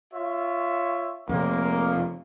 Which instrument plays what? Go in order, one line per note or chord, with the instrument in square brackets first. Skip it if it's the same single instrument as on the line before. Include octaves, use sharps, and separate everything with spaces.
[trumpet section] F4 C#5 E5
[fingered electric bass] F2 C3 [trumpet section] G#3 A#3